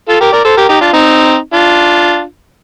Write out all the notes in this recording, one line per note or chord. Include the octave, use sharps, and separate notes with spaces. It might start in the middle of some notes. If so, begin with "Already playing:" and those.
F4 A4
G4 A#4
A#4 D5
A4 C5
G4 A#4
D#4 G4
D4 F4
C4 D#4
D4 F4